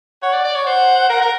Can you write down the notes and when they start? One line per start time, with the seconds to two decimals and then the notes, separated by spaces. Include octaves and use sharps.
0.23 C#5 F#5
0.33 D5
0.44 D5
0.55 C#5
0.66 C5 F#5
1.09 A#4
1.22 A#4